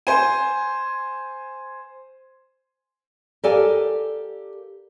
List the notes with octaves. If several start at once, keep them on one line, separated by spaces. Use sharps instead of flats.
C5 G#5
G4 A4 A#4 D5 F5 G#5